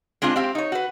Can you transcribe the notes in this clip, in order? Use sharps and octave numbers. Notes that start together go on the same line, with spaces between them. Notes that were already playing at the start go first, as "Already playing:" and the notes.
G#3 C4 D4 F4
C4 G4 F5
D#4 C#5
F#4 B4